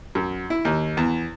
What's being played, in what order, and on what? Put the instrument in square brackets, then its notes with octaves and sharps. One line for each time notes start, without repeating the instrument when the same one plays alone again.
[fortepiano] F#2
E4
D#2
E2